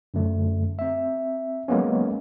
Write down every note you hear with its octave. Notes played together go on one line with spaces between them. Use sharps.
F#2 D3 A3
C4 E5
F#3 G#3 A#3 B3 C#4